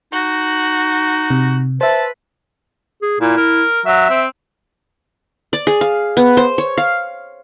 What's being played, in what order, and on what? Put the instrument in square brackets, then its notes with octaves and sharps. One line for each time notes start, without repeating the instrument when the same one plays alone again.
[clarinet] D#4 [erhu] F#4
[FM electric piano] C3
[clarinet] B4 [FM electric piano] C5 E5 [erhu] A5
[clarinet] G#4
[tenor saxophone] A#2 [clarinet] E4
[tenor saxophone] A#4
[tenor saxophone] F#3 [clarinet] E5
[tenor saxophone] C4
[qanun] D5
G#4
F5
B3
C5
C#5
F5